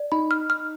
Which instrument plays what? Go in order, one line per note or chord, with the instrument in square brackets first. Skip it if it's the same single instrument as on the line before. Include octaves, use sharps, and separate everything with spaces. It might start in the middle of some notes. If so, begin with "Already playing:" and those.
Already playing: [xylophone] D5
[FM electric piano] D#4 [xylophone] B5
[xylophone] F6
F6